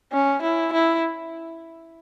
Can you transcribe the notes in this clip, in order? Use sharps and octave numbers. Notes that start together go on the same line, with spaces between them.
C#4
E4
E4